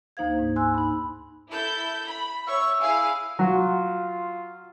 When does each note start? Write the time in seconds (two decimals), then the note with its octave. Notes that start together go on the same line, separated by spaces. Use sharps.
0.17 D2 A#3 D#4 C5 F5 G#6
0.39 G#2
0.56 G#5 C6 E6 F#6
0.74 D#4 B5
1.51 E4 A4 G6
2.08 B5
2.48 C#5 E5 C#6
2.81 E4 G#4 F5
3.39 F#3 F4